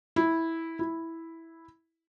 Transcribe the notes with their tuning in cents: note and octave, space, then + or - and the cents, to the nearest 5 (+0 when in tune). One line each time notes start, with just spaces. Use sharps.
E4 -10
E4 -5